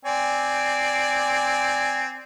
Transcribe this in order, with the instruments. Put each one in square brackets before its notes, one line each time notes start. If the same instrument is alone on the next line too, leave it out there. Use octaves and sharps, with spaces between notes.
[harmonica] C4 D5 G#5